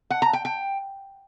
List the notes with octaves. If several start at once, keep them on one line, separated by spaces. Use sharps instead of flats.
F#5
A#5
G5
G5